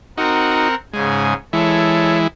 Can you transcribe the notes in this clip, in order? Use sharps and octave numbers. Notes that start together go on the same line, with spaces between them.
C4 D#4 F#4 A#4 F#5
G#2 C#3 G#3 G#5
E3 G#3 E4 A4 C#5